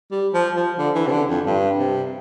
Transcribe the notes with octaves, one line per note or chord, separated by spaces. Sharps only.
G3
F3
F3
D3
E3
C3
D3
F2
G2
C3